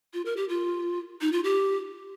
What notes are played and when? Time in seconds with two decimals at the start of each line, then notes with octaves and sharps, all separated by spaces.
0.14 F4
0.25 A#4
0.37 G4
0.49 F4
1.21 D#4
1.32 F4
1.44 G4